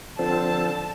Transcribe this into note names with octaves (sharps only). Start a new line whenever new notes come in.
D3 F3 C4 A5